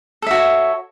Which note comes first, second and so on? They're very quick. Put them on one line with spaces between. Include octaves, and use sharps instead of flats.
A4 E5 F#4 C#5